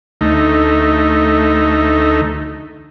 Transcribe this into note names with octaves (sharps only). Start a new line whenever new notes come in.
D2 A3 D#4